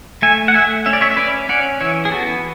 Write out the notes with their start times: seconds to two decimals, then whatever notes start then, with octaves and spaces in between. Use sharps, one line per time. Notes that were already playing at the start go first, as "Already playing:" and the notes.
0.22 A3 E5 G#5
0.48 F#5
0.54 A3 E5 G#5
0.86 C#4 E5
0.93 D5
1.01 C#5 E5
1.11 E5
1.17 C#4 B4 D5
1.49 C#4 D5 F#5
1.81 E3 C#5 E5
2.05 G#4
2.12 B3 F#4 A4